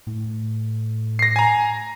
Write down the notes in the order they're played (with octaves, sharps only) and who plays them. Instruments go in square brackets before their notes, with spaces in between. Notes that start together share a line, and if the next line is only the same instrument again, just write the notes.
[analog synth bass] A2
[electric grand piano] A#6 C7
G#5 A#5